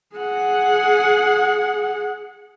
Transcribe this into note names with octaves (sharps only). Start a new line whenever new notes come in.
G#4 F#5